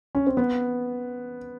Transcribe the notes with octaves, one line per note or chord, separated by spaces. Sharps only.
C#4
C4
B3